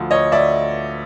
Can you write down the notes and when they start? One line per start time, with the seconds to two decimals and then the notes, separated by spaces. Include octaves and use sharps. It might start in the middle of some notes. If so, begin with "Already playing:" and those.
Already playing: D2 F3
0.11 D2 C#5 D#5
0.32 D2 D5 E5